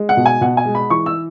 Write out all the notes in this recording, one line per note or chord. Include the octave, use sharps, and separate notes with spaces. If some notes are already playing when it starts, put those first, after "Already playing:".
Already playing: G#3
F#5
B2
G#5
B2 F#5
G#5
G#3
B5
E3 C#6
E6